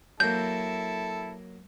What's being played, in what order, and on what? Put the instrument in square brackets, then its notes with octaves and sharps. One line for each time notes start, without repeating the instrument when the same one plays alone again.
[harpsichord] F#3 A#3 [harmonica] E4 A4 [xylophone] G6